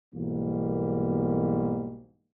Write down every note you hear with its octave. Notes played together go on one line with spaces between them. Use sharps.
B1 E2 G#2 G3 A#3